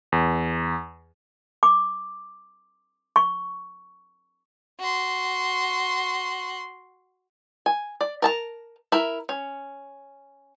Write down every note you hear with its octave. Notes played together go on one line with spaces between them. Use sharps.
E2
D6
C#6
F#4 C6
G#5
D5
A#4 A5 A#5
E4 A#4
C#4